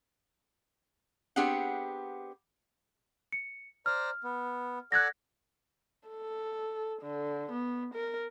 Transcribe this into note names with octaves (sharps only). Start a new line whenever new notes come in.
B3 C4 D4 G4 G#4 F#5
C#7
C5 D5 A#5 F6
B3
A4 D5 F#5 F#6 G#6 A#6
A4
D3
B3
A#4